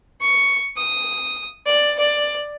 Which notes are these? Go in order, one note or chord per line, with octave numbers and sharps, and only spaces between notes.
C#6
D#6
D5
D5